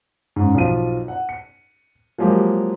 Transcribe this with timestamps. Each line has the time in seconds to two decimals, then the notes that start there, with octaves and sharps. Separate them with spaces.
0.36 G#2 C#3
0.54 B1 F3 F4 D#7
1.08 F#5
1.29 C#7
2.18 F3 F#3 G#3 A#3 G4